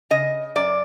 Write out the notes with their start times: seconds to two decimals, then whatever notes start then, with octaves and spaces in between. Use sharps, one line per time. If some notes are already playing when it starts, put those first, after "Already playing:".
0.10 C#3 D#5
0.56 F#2 D5